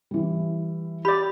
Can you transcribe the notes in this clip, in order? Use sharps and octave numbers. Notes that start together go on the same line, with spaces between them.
E3 G3
G4 D5 B5